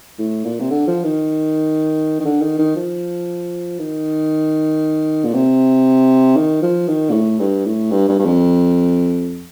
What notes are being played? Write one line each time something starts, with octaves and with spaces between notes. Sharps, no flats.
A2
A#2
C3
D3
F3
D#3
D#3
D3
D#3
D#3
F3
D#3
A#2
C3
D#3
F3
D#3
A#2
A2
G2
A2
G2
G2
G2
F2